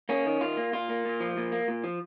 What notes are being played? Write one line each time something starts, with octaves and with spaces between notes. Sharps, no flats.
A#3 C#4
D#3
D#3 F4
A#3
A#2 F4
A#3
A#2
F3
A#2
A#3
A#2
F3